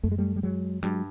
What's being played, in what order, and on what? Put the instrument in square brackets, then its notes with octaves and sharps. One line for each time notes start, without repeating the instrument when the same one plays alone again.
[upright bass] F#2 [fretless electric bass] A3
[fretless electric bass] G#3
G3 A3
G3
F#3 G#3
[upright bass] G2 [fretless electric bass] F#3 G#3